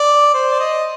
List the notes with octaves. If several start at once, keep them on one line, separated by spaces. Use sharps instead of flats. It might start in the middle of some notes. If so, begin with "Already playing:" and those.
Already playing: D5
C5
D5
D#5